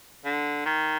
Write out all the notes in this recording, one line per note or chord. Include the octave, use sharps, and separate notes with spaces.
D3
D#3